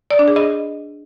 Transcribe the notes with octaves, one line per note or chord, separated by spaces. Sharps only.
D5
D4
G#4
D#5